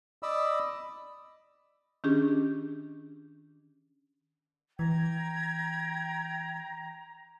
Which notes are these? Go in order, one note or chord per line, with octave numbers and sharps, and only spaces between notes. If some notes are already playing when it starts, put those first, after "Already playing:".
D5 D#5 B5 E6
D#3 C#4 D4 F4 G4 G#4
E3 G5 A#5 G#6